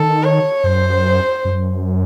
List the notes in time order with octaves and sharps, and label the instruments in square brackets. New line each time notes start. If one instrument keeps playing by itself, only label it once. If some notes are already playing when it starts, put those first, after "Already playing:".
Already playing: [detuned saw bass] D#3 [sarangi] A4
[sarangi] C#5
[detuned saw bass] F#2 [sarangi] C5
[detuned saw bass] F#2